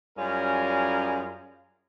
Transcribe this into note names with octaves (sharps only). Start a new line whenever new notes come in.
F#2 G3 C#4 F4 G#4 A#4